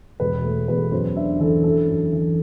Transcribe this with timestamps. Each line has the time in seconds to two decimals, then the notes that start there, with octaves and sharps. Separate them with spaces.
0.20 E1 B4
0.44 A3
0.68 E2 B4
0.92 F#2 C5
1.16 D4 E5
1.40 E3 A4
1.64 F#2 A4
1.88 F#2
2.13 E3